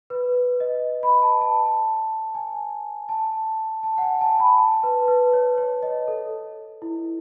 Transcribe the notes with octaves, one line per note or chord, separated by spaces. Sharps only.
B4
D#5
B5
A5
A5
G#5
A5
A5
F#5
G#5
A5
B5
A5
B4
B4
C#5
C#5
D#5
A4
E4